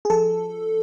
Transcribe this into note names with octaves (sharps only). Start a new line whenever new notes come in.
G#4
F3 A4